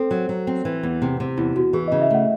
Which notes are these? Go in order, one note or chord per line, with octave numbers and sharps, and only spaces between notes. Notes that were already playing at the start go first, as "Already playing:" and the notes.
Already playing: C4 A4 C5
F#3
F#3
C4
E3
E2
C3
C3
E2 E4
E2 F#4
E3 G#4
D#5
C#3
E5
A3 F#5